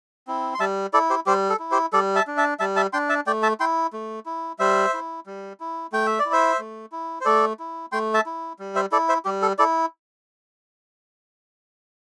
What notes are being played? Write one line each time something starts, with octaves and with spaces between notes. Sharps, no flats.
C4 E4
C6
G3 E5 A5
E4 A4 D5
G4 C5
G3 G4 C5
A4
E4
G4 C5
G3 A4 D5
E5 A5
D4
E5 A5
G3 E5 A5
E5 A5
D4 G5 C6
E5 A5
A3 D5 G5
E5 A5
E4 G5 C6
A3
E4
G3 C5 E5
E4
G3
E4
A3 G5
E5
D5
E4
C5 E5
A3
E4
C5
A3 A4 D5
E4
A3 G5 C6
E5 A5
E4
G3
C5 E5
E4 A4 D5
C5 E5
G3 G4
A4
E4 A4 D5